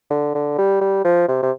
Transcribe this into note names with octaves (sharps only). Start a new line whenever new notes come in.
D3
D3
G3
G3
F3
C3
C3